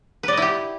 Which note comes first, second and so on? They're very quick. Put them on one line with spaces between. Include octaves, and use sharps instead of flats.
B4 D5 D#5 E4 G4